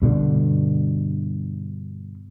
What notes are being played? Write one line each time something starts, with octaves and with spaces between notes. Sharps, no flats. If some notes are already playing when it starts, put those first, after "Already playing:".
G2 B2 D3